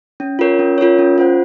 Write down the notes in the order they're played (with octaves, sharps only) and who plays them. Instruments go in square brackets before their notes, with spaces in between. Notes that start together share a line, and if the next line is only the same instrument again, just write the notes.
[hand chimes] C#4
F4 A#4 C#5
C#4
F4 A#4 C#5
C#4
F4 C5 F#5